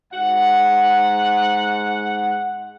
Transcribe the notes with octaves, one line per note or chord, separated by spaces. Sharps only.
G#2 F#5